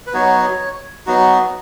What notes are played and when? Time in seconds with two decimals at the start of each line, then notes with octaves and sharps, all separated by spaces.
0.07 B4
0.14 F#3 B3 D#4 F#4 C#5
1.06 F#3 B3 D#4 F#4